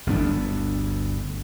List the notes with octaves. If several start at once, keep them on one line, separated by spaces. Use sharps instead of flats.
G1 D2 B3 D4